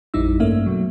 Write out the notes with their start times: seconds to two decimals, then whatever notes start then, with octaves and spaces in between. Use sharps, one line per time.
0.14 A1 F2 G3 D#4 E4 E6
0.40 G2 A3 A#3 C#4 E5
0.66 B2 F#3